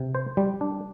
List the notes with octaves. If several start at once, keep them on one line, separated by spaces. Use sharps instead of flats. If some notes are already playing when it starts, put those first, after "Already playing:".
Already playing: C3
C5
G3
D4